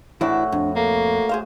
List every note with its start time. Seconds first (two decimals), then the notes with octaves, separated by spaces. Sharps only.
0.21 A2 E3 D4 E4 F#4
0.52 F2 D4
0.76 A#3 A4
1.29 G#4 C5 F5